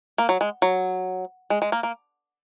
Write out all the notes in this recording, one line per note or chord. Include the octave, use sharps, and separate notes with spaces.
A#3
F#3
G#3
F#3
G#3
G#3
A#3
A#3